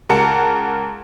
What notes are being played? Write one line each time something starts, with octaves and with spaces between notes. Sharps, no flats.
C#2 A#4 F#5 A5 C#7